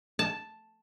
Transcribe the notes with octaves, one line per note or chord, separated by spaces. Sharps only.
A5